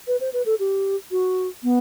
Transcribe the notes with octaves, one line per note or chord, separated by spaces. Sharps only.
B4
C5
B4
A4
G4
F#4
B3